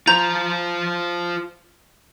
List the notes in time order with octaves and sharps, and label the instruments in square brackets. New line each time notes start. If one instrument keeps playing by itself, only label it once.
[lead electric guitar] F4 C5 [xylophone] A#5 G6 F7